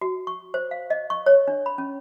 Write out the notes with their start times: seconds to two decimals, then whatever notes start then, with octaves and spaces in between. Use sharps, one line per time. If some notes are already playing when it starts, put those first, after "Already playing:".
0.01 F#4
0.27 C#6
0.54 C5
0.71 F5
0.90 D#5
1.10 C#6
1.26 C#5
1.48 D4
1.66 B5
1.78 C#4